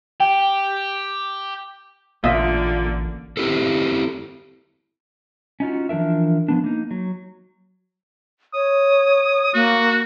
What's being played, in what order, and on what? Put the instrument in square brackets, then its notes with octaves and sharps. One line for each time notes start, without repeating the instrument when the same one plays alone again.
[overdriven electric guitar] G4 [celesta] G5
[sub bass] A1 [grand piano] A#2 [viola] D3 A#3 [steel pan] F4 D#5 E5
[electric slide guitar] C4 E4 G4 A4
C#4 D#4 F4 F#4
E3 F3 D4 A#4 E5
F3 B3 D4
A#3 D#4
F#3
[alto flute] C#5 [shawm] D#6
[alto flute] A#3 [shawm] F#4